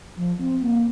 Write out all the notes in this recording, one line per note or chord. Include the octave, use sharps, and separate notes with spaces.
F3
C4
A#3